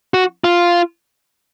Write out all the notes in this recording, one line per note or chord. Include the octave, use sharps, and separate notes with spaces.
F#4
F4